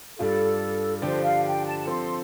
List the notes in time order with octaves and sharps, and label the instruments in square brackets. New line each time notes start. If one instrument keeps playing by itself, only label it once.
[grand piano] G2 G3 D4 F4 [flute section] A4
[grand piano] D3 F3 D4 G4 D5 [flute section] C5
[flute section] F5
G5
A5
[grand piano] F3 C4 A4 [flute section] C6